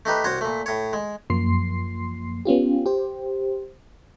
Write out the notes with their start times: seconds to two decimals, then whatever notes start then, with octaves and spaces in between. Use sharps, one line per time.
0.05 A3 D#4 G4 B4
0.24 C2 F#4 C5 C#5
0.41 A#2 A3
0.66 A2 C#5
0.93 G#3
1.30 F#2 F3 A#3 C6 C7
2.45 B3 C#4 F4 G4
2.86 G4 C5